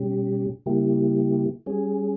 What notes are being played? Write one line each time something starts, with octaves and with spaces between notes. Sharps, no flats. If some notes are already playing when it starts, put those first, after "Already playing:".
Already playing: B2 G3 C#4 G4
C#3 G3 A#3 E4 G4
G3 C#4 G#4